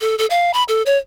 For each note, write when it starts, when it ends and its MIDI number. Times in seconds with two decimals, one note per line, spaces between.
0.01 0.16 69
0.18 0.26 69
0.30 0.51 77
0.54 0.63 83
0.68 0.82 69
0.86 0.97 73